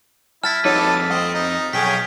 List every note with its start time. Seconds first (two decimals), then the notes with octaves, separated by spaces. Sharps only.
0.44 E4 A5 F6 A6 B6
0.65 F2 D#4 F#4 A4 B4 C#5 D6
1.10 C4 D#5 F5
1.34 D#4
1.73 B1 C#4 G#4 G5 B6